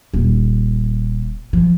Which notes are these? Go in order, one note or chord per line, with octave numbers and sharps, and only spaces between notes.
D#1
F3